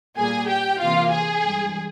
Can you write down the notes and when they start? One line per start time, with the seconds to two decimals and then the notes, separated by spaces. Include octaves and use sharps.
0.17 A#2 G3 A#3 G#4 G#5
0.48 G4 G5
0.80 C3 E3 A#3 F4 F5
1.11 G#4 G#5
1.44 G2 E3 G#3